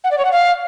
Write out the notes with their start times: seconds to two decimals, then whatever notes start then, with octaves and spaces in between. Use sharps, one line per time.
0.04 F#5
0.11 D5
0.18 C#5
0.25 F#5
0.32 F5